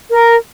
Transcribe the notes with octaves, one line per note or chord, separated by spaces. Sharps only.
A#4